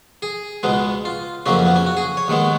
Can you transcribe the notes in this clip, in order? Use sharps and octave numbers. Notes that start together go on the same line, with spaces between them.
G#4
C#2 B2 G#3 B3
F4
F2 C#3 F#3 A#3 C#4
B3
C#4
F#4
G#4
C#5
D#2 D#3 G#3 B3